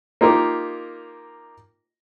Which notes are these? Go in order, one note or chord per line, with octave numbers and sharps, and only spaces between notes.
A#3 D#4 F4 G4 A#4